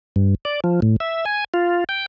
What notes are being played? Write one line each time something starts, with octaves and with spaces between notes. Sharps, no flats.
G2
D5
F3
A2
E5
G#5
F4
G5